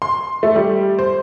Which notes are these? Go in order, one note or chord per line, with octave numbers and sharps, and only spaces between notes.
C6
A3
G3
C5